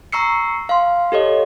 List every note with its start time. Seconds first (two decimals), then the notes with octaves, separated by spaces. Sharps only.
0.12 A#5 C#6 E6 C7 C#7
0.69 F5 C6
1.12 G4 A4 C#5 D#5